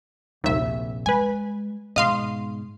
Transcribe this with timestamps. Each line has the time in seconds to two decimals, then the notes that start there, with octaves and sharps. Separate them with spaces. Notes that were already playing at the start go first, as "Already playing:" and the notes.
0.44 F1 A#1 D#2 E5
1.06 G#3 B4 G#5
1.96 G#2 B2 D#5 F5 C6